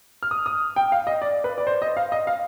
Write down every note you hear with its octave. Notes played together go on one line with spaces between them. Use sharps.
F6
D#6
D#6
G5
F5
D#5
D5
B4
D5
C5
D#5
F5
D#5
F5